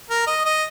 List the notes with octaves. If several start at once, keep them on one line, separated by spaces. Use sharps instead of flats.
A#4
D#5
D#5